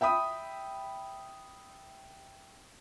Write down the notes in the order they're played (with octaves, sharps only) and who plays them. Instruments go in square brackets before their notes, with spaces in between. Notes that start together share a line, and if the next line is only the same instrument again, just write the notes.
[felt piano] E5 G5 B5 D#6